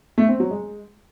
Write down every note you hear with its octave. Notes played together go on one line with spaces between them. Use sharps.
A3
C4
F#3
G#3